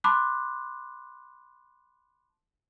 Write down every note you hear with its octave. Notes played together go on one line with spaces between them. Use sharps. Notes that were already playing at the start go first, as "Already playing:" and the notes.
A5 B5 C6 D6 F#6